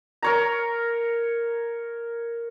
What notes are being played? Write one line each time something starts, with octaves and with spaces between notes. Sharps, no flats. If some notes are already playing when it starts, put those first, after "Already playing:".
A#4 C#5 A#5